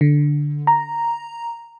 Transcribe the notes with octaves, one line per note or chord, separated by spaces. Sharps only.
D3
A#5